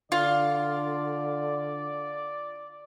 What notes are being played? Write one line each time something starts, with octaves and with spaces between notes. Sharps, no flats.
D3 F4 D5